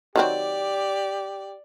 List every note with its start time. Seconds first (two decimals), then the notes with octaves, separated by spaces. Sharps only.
0.16 D#3 F#3 C4 G4 D5